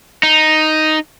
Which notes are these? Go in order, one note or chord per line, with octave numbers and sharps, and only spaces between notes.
D#4